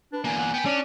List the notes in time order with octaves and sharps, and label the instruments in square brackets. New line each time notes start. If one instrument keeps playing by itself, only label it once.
[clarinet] D4 [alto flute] B4
[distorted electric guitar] E2 A#3 [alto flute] G#5
[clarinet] F#5
[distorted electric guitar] B3 B5 [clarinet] G5
[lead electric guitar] C#4 [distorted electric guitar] D4 [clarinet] D5